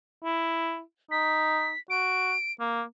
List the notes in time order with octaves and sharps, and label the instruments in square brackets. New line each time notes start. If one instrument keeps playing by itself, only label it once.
[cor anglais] E4
[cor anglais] D#4 [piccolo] B6
[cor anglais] F#4 [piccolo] D7
[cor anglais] A#3